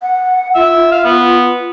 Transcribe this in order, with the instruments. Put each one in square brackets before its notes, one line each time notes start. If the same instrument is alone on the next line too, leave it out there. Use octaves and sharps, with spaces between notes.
[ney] F#5
[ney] F4 [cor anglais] E5
[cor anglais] F5
B3